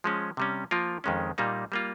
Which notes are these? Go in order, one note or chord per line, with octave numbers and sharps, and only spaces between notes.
F3 G#3 C#4
C3 G3 C#4
F3 A#3 F4 A#4
F2 D#3 G#3 C#4
A#2 G3 A#3 D#4
G3 A#3 F4